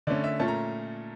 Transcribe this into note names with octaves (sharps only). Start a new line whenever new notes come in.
D3 A3 C#4 D5
E5
A#2 A3 C#4 A5
A#5